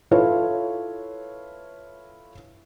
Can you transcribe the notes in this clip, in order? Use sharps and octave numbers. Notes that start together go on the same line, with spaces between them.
E4 F4 A4 B4 C#5 F5